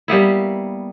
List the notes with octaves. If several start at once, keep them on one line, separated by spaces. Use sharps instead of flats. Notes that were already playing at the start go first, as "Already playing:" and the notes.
G3 A#3 B3 E4